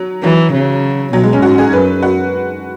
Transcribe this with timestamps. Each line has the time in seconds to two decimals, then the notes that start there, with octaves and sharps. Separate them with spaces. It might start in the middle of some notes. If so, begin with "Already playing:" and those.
Already playing: F#3
0.23 E3 F#3
0.53 C#3
1.13 B2 F#3
1.23 G#3
1.33 C#4
1.42 G#2 F#4
1.58 G#4
1.73 F#2 B4
2.02 F#4